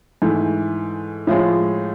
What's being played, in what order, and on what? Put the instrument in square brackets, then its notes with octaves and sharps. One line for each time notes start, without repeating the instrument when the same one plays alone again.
[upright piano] G#2 E3 A3
A2 F3 G#3